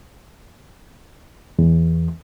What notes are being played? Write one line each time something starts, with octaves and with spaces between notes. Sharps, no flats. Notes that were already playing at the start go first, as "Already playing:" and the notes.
E2